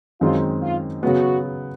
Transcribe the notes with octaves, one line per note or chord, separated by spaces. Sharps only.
F#2 D#3 G#3 C4 D#4 F4
F4
C#3 F#3 B3 F#4